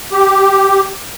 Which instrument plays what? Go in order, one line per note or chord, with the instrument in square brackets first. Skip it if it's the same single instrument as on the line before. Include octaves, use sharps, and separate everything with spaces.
[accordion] G4